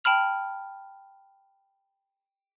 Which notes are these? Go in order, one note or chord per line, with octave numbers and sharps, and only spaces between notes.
G5 A5 B5 F6 F7